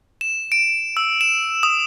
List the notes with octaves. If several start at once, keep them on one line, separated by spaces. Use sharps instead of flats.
E7
D7
E6
E7
D#6